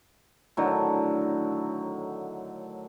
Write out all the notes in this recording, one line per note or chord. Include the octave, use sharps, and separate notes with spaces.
A2 D3 D#3 F#3